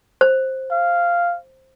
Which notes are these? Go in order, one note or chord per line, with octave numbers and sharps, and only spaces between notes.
C5
F5